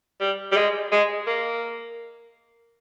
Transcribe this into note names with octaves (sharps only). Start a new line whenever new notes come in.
G3
G3
G#3
G#3
A#3